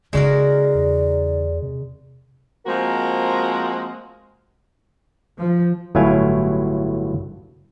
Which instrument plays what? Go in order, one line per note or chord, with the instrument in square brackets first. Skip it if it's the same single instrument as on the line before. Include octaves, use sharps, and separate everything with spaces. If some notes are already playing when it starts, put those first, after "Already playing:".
[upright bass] C#3 D#4 [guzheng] G#3 F#4 A#4 [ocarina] D5
[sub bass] E2
C3
[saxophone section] F3 G#3 A#3 C4 F#4 A#4
[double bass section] F3
[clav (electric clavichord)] G1 A2 F#3 E4 F5 G#5